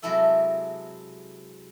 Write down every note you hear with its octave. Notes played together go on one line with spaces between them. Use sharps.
C3 F#3 G#3 E4 A4 E5